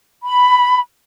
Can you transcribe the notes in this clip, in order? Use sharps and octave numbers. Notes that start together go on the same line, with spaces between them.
B5